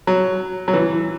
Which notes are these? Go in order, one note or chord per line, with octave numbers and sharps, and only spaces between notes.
F#3
F#3
E3